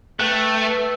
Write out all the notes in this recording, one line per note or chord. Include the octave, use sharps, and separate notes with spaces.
A3 B4 G5 F#6
E6